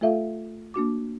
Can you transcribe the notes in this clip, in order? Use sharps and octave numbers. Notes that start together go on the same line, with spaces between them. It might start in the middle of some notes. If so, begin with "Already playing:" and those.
A3 F4 A4 E5 F5
A#3 D4 F#4 D6